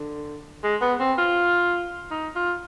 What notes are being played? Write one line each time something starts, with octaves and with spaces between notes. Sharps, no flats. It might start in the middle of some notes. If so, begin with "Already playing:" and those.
Already playing: D3
G#3
B3
C4
F4
D#4
F4